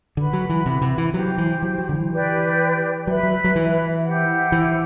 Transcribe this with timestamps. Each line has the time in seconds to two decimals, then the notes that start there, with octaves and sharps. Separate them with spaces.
0.17 D3 F#4 B4 F#5 B5
0.33 F#3
0.49 E3
0.66 C3
0.81 C3
0.98 E3
1.14 F#3 G4 C5 G5
1.38 E3
1.62 F#3
1.78 F#3
1.89 D3
1.94 E3
2.11 G4 B4 D5 G5
3.07 F#3 B4 E5 B5
3.23 F#3
3.44 F#3
3.56 E3
4.04 E4 G4 C5 F#5
4.52 E3